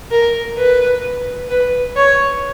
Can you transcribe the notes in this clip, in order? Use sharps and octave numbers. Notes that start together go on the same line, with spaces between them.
A#4
B4
B4
C#5